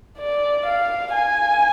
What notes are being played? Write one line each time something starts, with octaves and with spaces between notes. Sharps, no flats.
D5
F5
G#5